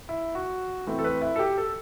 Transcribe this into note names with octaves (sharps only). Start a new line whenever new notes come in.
E4
F#4
E3 A3 C4 E4
A4
B4
E4
A4
G4
A4